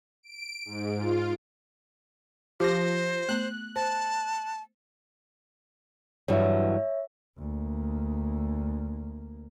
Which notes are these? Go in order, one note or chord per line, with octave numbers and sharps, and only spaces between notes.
D7
G#2
F4
F3 G4 C5 D6 A#6
A3 B3 F#6
C5 A5
G2 E3 F#3 C#5 E5
D2 A#3